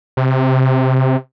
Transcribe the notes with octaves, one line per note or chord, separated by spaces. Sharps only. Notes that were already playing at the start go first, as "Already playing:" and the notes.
C3